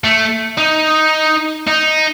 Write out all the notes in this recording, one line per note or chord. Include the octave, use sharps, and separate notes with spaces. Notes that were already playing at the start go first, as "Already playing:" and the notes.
A3
D#4
D#4